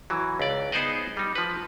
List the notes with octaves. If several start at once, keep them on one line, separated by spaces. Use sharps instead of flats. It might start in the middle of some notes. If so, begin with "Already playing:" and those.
E3 F#3
C#2 D5
B3 D#4 G#4 C5 D5 D#5
G3 D#4
F3 B4